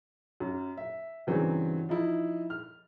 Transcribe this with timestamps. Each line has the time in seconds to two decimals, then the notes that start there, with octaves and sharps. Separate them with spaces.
0.40 F#2
0.77 E5
1.27 G2 C#3 E3 F#3 C4
1.89 F3 D#4 E4
2.50 F6